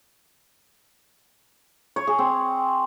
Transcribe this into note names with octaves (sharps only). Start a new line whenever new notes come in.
C#5
G#4
C4